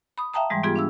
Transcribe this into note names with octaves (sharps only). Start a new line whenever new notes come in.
B5 D#6
E5 F5 G5 A5 A#5 D#6
G#2 E3 G3 G#3
G#2 B3 F4 G4 G#4 G#6
D4 F5 E6